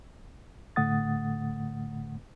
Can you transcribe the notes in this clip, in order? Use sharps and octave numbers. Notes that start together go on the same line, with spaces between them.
A2 D3 A3 F#5 D#6 A6